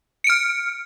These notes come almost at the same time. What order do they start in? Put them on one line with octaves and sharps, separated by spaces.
C#7 D7 F6